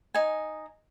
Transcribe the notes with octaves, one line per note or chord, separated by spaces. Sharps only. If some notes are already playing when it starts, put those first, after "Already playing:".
D#4 G#5